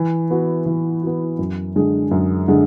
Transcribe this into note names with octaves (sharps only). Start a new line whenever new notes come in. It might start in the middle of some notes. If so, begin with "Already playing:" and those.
Already playing: E3
B3 F#4
E3
B3 F#4
F#2
D3 G#3 D4
F#2
D3 G#3 D4